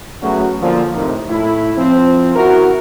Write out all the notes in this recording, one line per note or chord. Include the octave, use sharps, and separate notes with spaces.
F#3 A3 B3 C#4 F#4 G#4
A#2 D3 F3
F2 A2 C3 D#3
A2 E4
F3 C4
E4 F#4 A#4